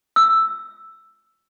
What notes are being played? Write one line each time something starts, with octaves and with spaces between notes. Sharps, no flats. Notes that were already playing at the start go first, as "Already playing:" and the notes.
E6